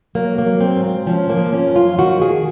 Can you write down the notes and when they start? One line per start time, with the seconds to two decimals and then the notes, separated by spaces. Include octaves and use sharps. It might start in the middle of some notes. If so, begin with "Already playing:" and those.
0.15 F#3 A#3
0.38 A#3
0.46 F#3
0.60 C4
0.76 G#2
0.84 C4
1.07 F3 C#4
1.30 A#3
1.37 F3
1.53 C#4
1.68 F#2
1.76 F4
1.99 D#3 F#4
2.22 G#4